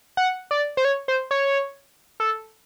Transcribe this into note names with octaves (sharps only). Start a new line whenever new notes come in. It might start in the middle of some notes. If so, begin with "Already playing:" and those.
F#5
D5
C5
C#5
C5
C#5
A4